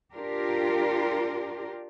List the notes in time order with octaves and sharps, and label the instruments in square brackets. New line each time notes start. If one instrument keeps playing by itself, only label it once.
[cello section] D4 F4 G4 A#4